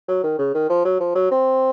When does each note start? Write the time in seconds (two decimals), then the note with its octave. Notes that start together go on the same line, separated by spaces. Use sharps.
0.08 F#3
0.24 D#3
0.39 C#3
0.54 D#3
0.69 F3
0.85 F#3
1.00 F3
1.15 F#3
1.31 C4